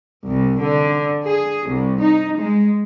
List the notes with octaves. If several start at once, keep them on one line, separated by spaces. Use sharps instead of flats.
C2
D3
G#4
C2
D#4
G#3